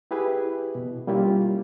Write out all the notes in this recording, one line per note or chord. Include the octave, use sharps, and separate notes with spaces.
E4 G4 G#4 B4 E5
B2
G3 A#3 C#4 E4 F4 G4